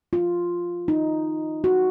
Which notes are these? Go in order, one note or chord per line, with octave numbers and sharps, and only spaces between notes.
F4
D#4
F#4